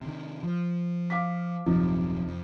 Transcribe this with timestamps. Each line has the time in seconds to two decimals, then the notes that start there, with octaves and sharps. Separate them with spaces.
0.02 C3 D#3
0.43 F3
1.10 F5 D6 B6
1.66 D#1 F#2 C3 F3 D#4
2.27 F2